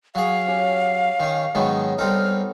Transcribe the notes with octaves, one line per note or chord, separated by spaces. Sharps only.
F#3 G#4 F5
C#4 G4
D#3 C#4
G#2 D#3 F#3 B3 C#4 D#4
C2 C4 D#4 A4 F6